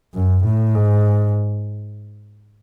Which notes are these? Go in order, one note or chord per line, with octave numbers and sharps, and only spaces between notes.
F#2
A2
G#2